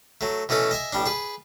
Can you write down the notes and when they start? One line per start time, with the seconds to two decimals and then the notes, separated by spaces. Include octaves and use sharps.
0.21 F#3 A3
0.49 B2 E3 A3 C#4 A4
0.71 D#5 E5 G#5
0.93 A1 G3 D4
1.06 G#4 B4